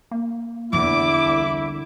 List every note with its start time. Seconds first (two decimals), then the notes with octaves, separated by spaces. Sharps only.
0.11 A#3
0.73 E2 D3 E4 D6
1.26 C2